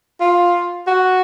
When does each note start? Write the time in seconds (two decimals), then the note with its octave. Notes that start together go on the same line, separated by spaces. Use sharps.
0.21 F4
0.87 F#4